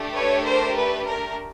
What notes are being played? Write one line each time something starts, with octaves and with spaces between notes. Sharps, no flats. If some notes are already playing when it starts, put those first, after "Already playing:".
Already playing: A3 D4 G4
B4 C#5
A#4 C5
B4
A#4